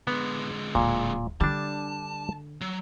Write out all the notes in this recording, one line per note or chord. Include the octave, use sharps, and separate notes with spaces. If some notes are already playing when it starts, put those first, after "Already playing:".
D3 G#3 B3
D1 A#2
D3 G3 D4 A5
F#3